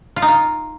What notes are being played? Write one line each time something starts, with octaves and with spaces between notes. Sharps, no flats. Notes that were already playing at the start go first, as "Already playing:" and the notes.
F4
D#4
F4